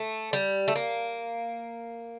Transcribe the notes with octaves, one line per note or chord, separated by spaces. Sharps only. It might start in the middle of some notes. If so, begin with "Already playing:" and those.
Already playing: A3
G3
A3
A#3